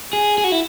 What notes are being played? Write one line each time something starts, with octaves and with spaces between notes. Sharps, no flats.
G#4
G#4
F#4
E4